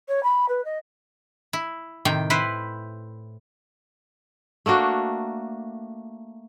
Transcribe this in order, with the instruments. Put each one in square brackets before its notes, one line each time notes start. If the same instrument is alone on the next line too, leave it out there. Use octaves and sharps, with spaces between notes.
[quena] C#5
B5
B4
D#5
[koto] E4
A2 C3 D#3 G5
E4 B4 C5
[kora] A3 A#3 D4 F#4